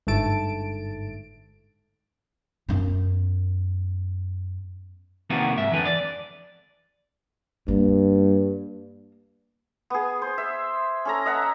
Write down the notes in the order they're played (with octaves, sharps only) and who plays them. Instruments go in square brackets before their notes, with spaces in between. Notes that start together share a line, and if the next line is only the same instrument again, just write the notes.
[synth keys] G1 G#2 A3 A5 D7
[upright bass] F#2 B3
[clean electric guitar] C3 D#3 F3 A#3 B3 F#4
G#2 E5
F2 D3 E3 F3 B4
D5
[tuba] G2 [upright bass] A#3
[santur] B3 G#4
C5
E5
C#4 A4 A#5
D#5 E5 F#5 A#5